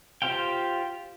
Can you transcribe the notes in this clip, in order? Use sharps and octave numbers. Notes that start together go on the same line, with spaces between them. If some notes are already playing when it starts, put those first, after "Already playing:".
F4 G4 C5 F5 G5